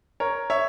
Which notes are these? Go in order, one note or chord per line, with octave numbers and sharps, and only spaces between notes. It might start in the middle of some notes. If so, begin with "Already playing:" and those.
A#4 C#5
C#5 E5